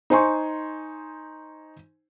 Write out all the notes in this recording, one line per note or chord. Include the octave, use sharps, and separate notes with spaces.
D#4 C5 G#5 C6 C#6